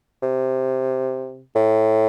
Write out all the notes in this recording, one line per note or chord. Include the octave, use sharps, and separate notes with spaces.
C3
A2